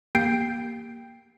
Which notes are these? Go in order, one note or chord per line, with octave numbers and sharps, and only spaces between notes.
A#3 G4 G5 G6 C7 D7